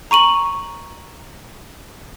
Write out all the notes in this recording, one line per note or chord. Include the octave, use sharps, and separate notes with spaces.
A#5 C#6 D#7 F#7